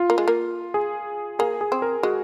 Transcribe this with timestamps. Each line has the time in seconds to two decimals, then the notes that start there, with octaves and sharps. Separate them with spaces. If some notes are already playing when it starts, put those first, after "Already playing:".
Already playing: F4
0.10 A#3
0.18 G#3
0.28 A#3
0.74 G#4
1.39 A#3 G#4
1.61 G#4
1.72 C4
1.82 A#4
2.03 G#3 F#4